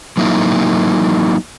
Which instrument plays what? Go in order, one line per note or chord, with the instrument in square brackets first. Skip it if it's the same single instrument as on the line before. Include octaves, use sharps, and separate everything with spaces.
[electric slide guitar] F#3 A#3 D#4 E4